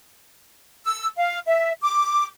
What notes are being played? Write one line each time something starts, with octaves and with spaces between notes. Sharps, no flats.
E6
F5
E5
D6